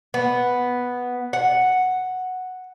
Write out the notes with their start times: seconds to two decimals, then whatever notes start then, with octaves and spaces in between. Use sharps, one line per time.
0.14 B3
1.33 F#5